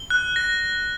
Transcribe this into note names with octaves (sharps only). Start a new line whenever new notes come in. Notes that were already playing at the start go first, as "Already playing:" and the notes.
Already playing: G7
F#6
A#6